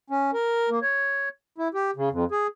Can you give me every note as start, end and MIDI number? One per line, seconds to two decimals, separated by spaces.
0.10 0.31 61
0.33 0.69 70
0.69 0.79 58
0.82 1.29 73
1.58 1.68 64
1.74 1.91 67
1.96 2.09 49
2.11 2.25 41
2.31 2.47 68